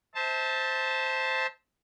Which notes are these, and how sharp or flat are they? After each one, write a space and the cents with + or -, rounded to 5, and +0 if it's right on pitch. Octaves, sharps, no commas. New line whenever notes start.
C5 +0 E5 -35 A5 +0